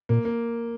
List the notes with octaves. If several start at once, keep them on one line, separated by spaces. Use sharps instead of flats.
A#2 A#3
A#3